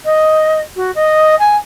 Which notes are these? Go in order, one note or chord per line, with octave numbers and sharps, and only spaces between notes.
D#5
F#4
D#5
G#5